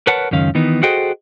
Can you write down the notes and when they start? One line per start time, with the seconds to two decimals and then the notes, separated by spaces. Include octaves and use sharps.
0.07 A#4 B4 C#5 F#5 A5
0.31 C#2 F#2 D#3 C#4 F5
0.55 D#3 E3 B3 D#4
0.83 F#4 G#4 A4 C5 D#5 G5